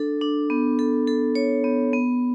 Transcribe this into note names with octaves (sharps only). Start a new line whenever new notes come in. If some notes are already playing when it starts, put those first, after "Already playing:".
Already playing: D4 A4
D4
B3
A4
A4
C#5
B3
B3